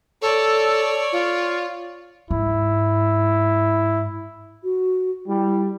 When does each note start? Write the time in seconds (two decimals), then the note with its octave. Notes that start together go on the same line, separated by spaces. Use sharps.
0.22 A4 C#5 D5
1.12 F4
2.31 G#2 E4
4.64 F#4
5.27 G3 E4